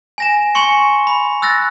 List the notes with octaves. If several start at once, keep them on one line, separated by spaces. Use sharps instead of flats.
G#5 A#6 E7
G#5 C6 C#6 C#7
B5
E6 F#6 A6 A#6